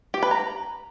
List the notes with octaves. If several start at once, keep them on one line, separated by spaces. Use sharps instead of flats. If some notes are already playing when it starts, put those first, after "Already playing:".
G4
B4
A#5